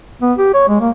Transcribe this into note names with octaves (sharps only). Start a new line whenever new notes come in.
B3
G4
C#5
G#3
A#3